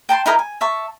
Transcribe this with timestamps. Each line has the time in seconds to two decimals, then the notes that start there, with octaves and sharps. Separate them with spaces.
0.09 G5 A5 A#5 C6
0.26 D#4 E4 A#4 D#5
0.39 G#5
0.61 E5 A5 C#6